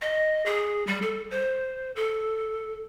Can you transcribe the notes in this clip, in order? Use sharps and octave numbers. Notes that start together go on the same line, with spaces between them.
D#5
G#4
G3
A4
C5
A4